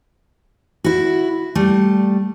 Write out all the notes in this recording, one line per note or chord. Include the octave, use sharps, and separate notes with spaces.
E4 F#4
G3 A3